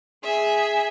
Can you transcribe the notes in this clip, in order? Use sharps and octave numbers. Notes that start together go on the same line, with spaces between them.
G#4 E5 G#5